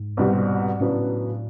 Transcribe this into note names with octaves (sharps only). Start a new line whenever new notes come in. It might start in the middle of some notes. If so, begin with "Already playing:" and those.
Already playing: G#2
C2 B2 G3 C4
A2 C#3 F#3 B3 D4